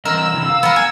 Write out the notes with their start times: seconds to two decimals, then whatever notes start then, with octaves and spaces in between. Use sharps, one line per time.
0.05 E3 C4 A#4 D#5 E6
0.33 C3 E3
0.50 F5
0.63 B3 A#4
0.76 G#5